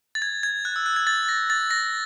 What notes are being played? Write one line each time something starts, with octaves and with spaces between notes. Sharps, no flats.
A6
G#6
G#6
F#6
E6
F#6
G#6
A6
A#6
A6
A#6